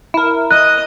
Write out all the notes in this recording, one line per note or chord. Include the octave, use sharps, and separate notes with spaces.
E4 A#4
D#5 D#6 F#6